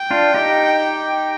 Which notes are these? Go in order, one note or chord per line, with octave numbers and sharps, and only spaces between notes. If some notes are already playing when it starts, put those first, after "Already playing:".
Already playing: G5
D4 F4
D#4 G4